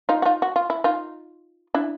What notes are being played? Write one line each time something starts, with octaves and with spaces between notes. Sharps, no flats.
D#4 F4
F#4
D#4 F4
F#4
F4
E4
D#4 F4
D4 E4